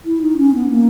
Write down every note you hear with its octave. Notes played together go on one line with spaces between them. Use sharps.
E4
D#4
C#4
B3
A#3